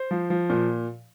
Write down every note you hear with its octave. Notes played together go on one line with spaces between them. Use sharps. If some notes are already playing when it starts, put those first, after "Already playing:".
Already playing: C5
F3
F3
A#2